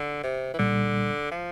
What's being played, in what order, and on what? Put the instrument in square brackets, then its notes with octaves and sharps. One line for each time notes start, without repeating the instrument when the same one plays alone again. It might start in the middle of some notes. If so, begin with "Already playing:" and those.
Already playing: [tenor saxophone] D3
C3
E3
[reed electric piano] C2 A#2 G3 [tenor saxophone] D3
[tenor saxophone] F3